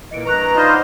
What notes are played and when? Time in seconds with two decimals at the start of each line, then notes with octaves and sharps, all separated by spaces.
0.11 A#2 E3 D#5 C#7 D7
0.25 G2 B4 A#5 C#6 F#6
0.55 D#4 F4 C5 D5 D#5 B5
0.68 F#5 D6